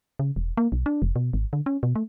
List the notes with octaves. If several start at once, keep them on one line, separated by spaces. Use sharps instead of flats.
C#3
E1
A#3
B1
D4
F1
B2
G#1
D3
C#4
B2
A3